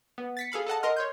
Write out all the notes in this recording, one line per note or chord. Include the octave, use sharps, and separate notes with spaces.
B3
A6 B6 C#7
G#4 A4 F5 B5
A4 D#5 F#5 A5
A#4 D#5 C6 F6
C#5 C6 G6